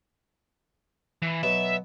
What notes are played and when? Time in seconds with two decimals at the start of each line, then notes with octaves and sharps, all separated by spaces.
1.22 E3
1.43 B2 F#3 B3 E5